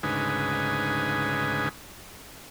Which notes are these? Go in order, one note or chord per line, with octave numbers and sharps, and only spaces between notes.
D2 G#2 C#3 D#4 B4 G#5